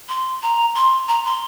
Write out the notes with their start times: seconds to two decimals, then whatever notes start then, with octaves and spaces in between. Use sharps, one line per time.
0.09 C6
0.43 A#5
0.75 C6
1.08 A#5
1.25 C6